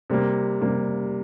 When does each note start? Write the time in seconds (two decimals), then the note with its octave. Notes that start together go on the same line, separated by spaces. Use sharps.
0.10 C3 G3 A#3
0.61 C3 G3 A#3